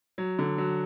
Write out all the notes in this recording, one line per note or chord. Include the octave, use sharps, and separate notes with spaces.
F#3
D3
F#3